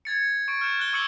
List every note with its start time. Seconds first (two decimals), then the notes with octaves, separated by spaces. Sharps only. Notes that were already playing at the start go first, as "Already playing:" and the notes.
0.05 G#6 A6 C#7
0.48 C#6 C#7 D7
0.61 F6 G6 E7
0.79 F#6 G#6 G7
0.93 C#6 D6 E6 C#7 F#7 G7